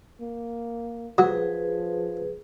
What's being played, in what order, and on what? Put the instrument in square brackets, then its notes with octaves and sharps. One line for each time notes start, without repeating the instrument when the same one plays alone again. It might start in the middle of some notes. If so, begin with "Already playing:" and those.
[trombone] A#3
[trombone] F3 [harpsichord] F#3 [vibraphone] G#4 B4